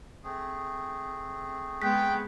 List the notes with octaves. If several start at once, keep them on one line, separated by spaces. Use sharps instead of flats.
A3 C4 G#4
G#3 B3 G5 F#6 B6